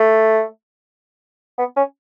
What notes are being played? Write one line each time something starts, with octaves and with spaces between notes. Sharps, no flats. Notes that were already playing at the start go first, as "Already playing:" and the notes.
Already playing: A3
B3
C#4